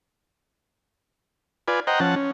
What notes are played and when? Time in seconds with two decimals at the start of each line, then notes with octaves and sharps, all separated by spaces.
1.68 F4 B4 D5 G#5
1.87 C5 D#5 F#5 G5 A#5
2.00 F3 C#4 F#5 A5
2.16 C#4